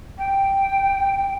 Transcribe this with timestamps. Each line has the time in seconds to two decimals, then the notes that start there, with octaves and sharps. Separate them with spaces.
0.17 G5